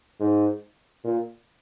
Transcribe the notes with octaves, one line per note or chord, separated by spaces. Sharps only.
G#2
A#2